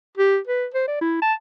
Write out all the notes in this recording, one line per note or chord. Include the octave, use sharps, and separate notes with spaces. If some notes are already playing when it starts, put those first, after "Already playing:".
G4
B4
C5
D5
E4
A5